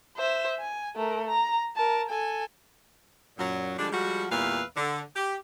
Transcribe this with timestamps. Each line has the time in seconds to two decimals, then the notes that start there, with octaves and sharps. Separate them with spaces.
0.17 C5 E5
0.60 G#5
0.96 A3 A#4
1.27 A#5
1.76 A#4 A5
2.09 A4 G#5
3.38 F#2 A#2 F#3
3.78 D3 F3 G3 G#3 D4
3.92 F3 G3 G#3 F#4
4.30 E2 A#2 G3 B4 E5 F5
4.76 D3
5.14 G4